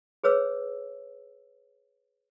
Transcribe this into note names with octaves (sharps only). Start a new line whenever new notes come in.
G#4 B4 C#5 E6